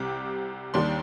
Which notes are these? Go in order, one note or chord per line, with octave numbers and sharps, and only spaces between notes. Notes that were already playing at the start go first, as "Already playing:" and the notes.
Already playing: C2 C3 G3 C4 D6
D#2 D#3 G3 A#3 D4 C6